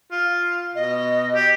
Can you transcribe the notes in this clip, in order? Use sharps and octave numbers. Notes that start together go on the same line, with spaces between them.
F4
B2 D#5
G4